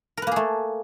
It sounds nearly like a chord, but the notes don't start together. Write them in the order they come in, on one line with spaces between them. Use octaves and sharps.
A#4 B4 A#3 G#4 A3